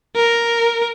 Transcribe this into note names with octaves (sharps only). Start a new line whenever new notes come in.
A#4